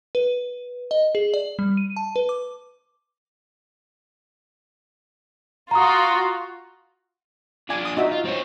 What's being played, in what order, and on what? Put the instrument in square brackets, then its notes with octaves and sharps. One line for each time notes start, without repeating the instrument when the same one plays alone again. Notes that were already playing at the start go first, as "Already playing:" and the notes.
[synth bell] B4
D#5
G#4
D5
G3
D#7
A5
B4
D6
[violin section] F4 F#4 [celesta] A#5 D#6
[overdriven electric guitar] D4 F4 [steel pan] G#5 D6
[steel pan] D#6
D#4 F#4 E5
[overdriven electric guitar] F4
C4 C#5